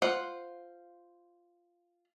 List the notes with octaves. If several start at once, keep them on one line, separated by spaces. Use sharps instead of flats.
F4 C5 F#5